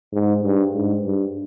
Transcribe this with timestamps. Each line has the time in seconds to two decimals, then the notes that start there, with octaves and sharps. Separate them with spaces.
0.13 G#2
0.43 G2
0.74 G#2
1.04 G2